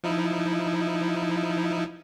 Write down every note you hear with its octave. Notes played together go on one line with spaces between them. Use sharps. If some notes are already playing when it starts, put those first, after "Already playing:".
F3 D#4 E4